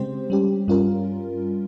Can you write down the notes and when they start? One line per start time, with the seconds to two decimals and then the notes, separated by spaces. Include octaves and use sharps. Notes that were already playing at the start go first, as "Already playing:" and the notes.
Already playing: C#3 G#3 C4 G4 C5
0.30 G3 C#4 G4
0.68 G2 G3 C#4 F4 A#4